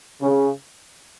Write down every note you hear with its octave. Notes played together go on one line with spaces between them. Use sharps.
C#3